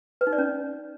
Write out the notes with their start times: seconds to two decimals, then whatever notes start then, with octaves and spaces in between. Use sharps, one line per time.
0.21 B4
0.27 D#4
0.33 D5
0.38 C#4